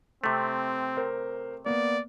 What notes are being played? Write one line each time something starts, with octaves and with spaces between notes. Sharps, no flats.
C3 A3 C4
A#4 C5
A#3 B3 D5